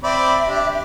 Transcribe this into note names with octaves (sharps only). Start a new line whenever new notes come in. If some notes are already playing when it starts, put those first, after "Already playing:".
C4 D5 E5 B5
D4 G4